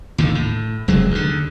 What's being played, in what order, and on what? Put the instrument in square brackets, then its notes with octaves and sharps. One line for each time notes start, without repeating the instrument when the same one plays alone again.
[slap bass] D#2 A2 D3
A2
F1 F#3 G#3
D#2 D3